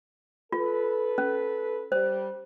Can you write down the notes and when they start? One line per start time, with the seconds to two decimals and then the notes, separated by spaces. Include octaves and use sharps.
0.52 F4 A4 B4
1.18 C#4
1.92 G3 C5